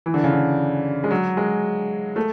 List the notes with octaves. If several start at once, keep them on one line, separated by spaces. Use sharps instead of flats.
E3
D3
C#3
D3
G#3
F#3
G#3
A3